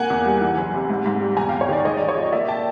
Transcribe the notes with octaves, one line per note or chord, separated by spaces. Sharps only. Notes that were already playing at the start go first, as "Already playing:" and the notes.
Already playing: A#3 F#5 G#5
E2
G3
E3
F#1
C3
G#2
G#2
G3
E2 G#5 A#5
F5 G5
E2
C#5
D#3 D5
G#3 C#5 D#5
D5
A1
C#5
F3
D#5
A#3 D5 E5
G5 A5